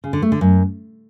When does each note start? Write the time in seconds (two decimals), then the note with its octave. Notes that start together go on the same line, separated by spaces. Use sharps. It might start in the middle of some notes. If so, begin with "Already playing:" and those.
0.04 C#3
0.13 D3
0.22 A3
0.32 D3
0.41 F#2